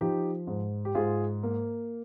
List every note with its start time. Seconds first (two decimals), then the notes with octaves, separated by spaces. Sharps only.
0.01 F3 D#4 G4
0.47 G#2
0.85 G4
0.95 G#2 F4 G#4
1.43 A#3